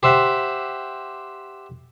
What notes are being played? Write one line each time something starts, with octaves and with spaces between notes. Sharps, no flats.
G4 C5 E5 F#5